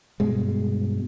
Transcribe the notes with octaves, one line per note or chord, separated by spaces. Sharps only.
G2 B2 G#3